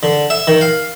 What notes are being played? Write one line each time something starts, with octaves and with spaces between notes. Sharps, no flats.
D3
E5
D#3
F5